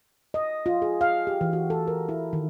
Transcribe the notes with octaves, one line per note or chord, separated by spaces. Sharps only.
D#5
F4
G#4
F5
G4
E3
F#4
A4
A#4
E4
D#3